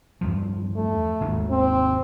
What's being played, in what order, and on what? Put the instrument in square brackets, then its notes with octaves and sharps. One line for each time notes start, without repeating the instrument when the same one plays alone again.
[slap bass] E2 G2 F3
[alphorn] A3
[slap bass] G#1 D#2 G#2
[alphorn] C4